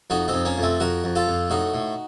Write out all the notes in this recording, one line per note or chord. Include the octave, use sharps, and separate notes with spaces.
F2 D#4 F#4
C4 D#4
F2
A#3 C#4
F2 A3 C4
F2 F#4 A#4
F2
F4 A4
F2
A2 D#4 F#4
A2